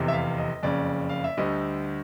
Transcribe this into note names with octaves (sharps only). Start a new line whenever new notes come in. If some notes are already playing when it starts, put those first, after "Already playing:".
Already playing: F1 E2 C3
E5
F5
D#5
F#1 F2 C#3 D5
F5
E5
D2 D3 G3 D#5